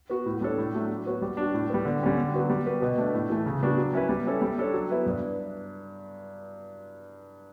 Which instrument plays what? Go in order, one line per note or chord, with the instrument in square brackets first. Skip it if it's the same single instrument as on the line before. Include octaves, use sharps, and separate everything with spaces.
[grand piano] B3 F#4
A2
G3 D4 A4 C#5
A2
F#3 A3 D4
F#3
B3 F#4 C#5
G3
D4 F#4
A2
G3 B3
D3
G3 C#4 G4
D3
F#3 B3 F#4
G3
B3 F#4 B4
B2
A3 D4
A2
E3 A3
C#3
G3 B3 D4 F#4
F#3
C#4 E4 B4
G3
C#4 E4 A4 C#5
G3
D4 A4 C#5
F#3
B3 E4 B4
G2